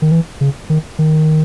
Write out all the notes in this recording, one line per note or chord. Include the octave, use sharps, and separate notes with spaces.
D#3
E3
C#3
D#3
D#3